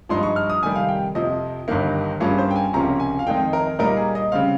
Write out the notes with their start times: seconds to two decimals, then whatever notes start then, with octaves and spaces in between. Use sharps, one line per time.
0.09 G2 F3 G#3 D#4 C6
0.23 C#6
0.36 F6
0.50 D#6
0.63 F2 C3 D#3 G3 G#5
0.76 F5
0.89 G5
1.15 F2 C3 F3 D#5
1.68 G1 G2 D#3 A#3
2.20 G2 G3 A#3 C#4 F4 G#4
2.38 C5
2.51 G5
2.56 G#5
2.73 C#2 C3 F3 A#3 C#4 A#5
3.00 G#5
3.19 F5
3.27 F2 D#3 G#3 D#4 G5
3.53 A#4
3.79 A#2 G3 A#3 D#4 A#4
3.97 G#4
4.15 D#5
4.32 C#3 G3 C4 F5